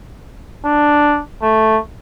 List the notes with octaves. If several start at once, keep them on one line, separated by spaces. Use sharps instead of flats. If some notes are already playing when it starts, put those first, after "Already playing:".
D4
A3